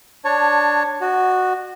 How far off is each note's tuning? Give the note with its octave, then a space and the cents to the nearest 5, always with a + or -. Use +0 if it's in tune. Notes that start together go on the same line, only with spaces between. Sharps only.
D4 +0 C#5 +0 A5 +20
F#4 +0 D5 +45